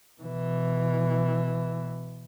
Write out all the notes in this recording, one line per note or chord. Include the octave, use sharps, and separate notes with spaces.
B2 E3